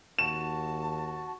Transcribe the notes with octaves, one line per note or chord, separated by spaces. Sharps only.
D#2 F#4 A5 E7